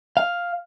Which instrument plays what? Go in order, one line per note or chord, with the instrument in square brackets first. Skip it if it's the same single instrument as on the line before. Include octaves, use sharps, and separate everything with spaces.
[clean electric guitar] F5